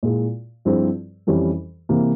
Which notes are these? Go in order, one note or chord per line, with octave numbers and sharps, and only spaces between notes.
A#2 G#3 E4
G2 F3 C4 E4 G#4
F2 E3 G3 C#4
C3 E3 A#3